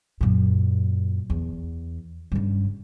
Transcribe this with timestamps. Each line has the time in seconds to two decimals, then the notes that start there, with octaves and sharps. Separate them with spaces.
0.21 F#2 A#2
1.30 E2
2.32 G2 C#3